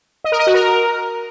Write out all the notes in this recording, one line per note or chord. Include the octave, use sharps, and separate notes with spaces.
D#5
A#4
D#5
F#4
A#4